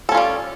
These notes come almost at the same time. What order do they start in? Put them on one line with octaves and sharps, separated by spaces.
A4 C#4 F4 G3